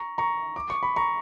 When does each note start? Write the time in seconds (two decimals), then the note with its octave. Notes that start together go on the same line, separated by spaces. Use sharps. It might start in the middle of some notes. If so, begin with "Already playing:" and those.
Already playing: A#5 C#6
0.18 A#5 C#6
0.56 D6
0.70 C#6
0.83 B5
0.96 A#5 C#6